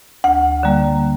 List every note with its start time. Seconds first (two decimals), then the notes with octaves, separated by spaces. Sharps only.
0.24 D2 F#5
0.63 D3 G3 A#3